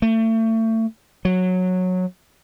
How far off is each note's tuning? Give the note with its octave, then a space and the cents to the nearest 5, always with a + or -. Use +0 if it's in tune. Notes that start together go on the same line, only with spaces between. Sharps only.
A3 +30
F#3 -15